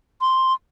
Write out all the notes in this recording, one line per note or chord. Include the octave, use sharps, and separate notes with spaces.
C6